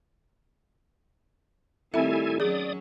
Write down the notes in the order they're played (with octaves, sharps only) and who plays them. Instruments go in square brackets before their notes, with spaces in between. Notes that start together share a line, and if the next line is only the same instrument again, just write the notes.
[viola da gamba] D#3 G3 A3 [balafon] C4 E5 [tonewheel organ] E4 A4 G#5
[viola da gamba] F#3 C#4 [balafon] G#4 [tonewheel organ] D5 D#6